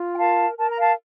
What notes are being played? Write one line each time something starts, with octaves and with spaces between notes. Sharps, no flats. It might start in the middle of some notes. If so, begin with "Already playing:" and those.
Already playing: F4
G5
A#4 F5 A5
A#4 A5
A#5
F5 A5